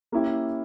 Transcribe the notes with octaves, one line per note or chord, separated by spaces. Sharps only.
A#3 C#4 E4 G4